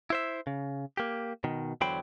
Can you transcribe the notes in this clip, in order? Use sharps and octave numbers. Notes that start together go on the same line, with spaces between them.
E4 C5 E5
C#3
A#3 G4
B2 D#3
E2 D3 F#3 C5 G5 B5